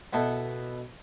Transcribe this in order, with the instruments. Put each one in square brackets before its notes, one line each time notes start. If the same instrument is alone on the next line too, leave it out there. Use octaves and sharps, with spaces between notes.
[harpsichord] B2 B3 E4 A4